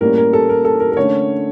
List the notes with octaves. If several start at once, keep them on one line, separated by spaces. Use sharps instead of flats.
A2 G3 A#3 C#4 A#4
A#4
A4
A#4
A4
A#4
A#4
D3 A3 C#4 C#5